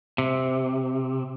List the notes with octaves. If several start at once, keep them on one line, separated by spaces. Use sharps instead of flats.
C3